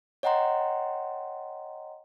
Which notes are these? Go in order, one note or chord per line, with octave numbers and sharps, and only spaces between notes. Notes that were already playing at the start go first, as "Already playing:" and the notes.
C#5 D#5 F#5 G5 A#5 C6